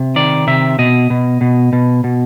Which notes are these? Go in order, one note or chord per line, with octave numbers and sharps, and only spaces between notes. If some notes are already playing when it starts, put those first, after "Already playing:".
Already playing: C3
D#3 D5
C3 E5
B2 D#5
B2
B2
B2
B2